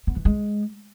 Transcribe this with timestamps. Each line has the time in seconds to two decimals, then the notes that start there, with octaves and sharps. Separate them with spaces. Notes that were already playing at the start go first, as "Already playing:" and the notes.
0.07 B3
0.16 E3
0.25 G#3